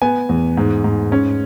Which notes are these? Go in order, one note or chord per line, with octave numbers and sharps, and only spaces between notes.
B3 G#5
E2
G#2
G#2
C#4